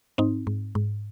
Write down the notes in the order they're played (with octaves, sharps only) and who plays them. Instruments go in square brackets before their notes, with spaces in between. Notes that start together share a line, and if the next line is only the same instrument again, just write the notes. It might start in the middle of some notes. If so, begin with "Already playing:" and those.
[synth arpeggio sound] G#2 C4 D#4
G#2
G#2